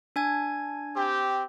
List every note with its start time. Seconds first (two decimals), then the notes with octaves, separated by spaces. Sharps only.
0.16 D4 G#5 G#6
0.95 C4 G4